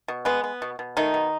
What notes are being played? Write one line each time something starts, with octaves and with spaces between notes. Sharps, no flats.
B2
G#3 B3
B3
B2
B2
D#3 A3 D#4
B2